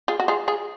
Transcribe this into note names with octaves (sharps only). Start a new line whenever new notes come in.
F4 G#4
F#4
F4 G#4
F4 G#4